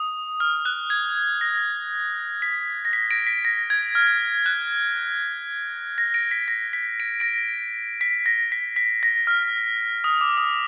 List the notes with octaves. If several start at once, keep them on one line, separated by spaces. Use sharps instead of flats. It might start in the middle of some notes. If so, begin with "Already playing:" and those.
Already playing: D#6
F6
F#6
G#6
A#6
B6
A#6
B6
A#6 D7
B6
A#6
G#6
F6
F#6
A#6
A#6 D7
B6
A#6
B6
D7
A#6 D7
B6
A#6
B6
B6
A#6
F6
D#6
D6
D#6